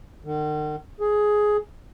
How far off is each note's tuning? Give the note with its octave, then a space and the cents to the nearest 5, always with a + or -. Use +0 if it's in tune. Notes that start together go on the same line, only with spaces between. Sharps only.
D#3 -45
G#4 +10